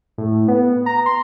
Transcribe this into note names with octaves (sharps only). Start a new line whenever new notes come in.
A2
B3
A#5
C6